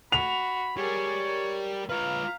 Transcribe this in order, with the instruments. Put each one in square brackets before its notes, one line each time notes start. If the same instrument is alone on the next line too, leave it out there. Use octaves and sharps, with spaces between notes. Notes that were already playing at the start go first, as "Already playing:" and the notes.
[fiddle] F#4 [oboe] B5 [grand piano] F7
[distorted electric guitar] G3 [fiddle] G#4 A#4 [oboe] C#5
[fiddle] A#4
[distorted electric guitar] F4 B4 [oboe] F5 [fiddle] A#5